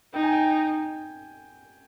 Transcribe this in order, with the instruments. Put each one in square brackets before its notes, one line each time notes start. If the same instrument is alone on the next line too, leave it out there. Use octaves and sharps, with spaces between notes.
[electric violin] D#4 [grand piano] G5
[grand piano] G#5
G5